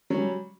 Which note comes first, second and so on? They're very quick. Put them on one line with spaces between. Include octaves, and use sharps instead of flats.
F#3 C#4 G3